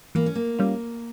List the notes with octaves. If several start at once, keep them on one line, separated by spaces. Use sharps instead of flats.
E3 A#3
C#4
A#3
G3 C#4 F4